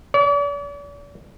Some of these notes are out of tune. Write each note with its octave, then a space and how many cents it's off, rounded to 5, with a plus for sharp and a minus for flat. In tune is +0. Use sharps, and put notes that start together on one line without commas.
D5 -45